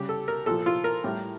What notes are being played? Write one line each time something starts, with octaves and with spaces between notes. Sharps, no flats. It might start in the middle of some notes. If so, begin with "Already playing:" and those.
Already playing: C#3 G3 G4
A4
A#4
A#2 F3 A4
F4
A#4
A2 G3